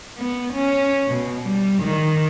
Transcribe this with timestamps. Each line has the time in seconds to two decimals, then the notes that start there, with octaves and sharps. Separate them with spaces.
0.18 B3
0.54 C#4
1.08 B2
1.47 G3
1.83 D#3